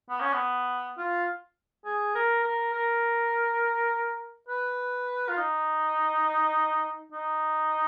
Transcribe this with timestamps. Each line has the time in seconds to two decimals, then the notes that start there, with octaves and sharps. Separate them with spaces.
0.10 B3
0.21 C#4
0.33 B3
0.98 F4
1.85 G#4
2.15 A#4
2.44 A#4
2.73 A#4
4.48 B4
5.29 F4
5.37 D#4
7.12 D#4